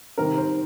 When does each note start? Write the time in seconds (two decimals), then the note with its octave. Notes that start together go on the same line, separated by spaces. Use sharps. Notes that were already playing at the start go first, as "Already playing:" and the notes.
0.18 C3 D#3 G3 C4 A#4
0.38 C5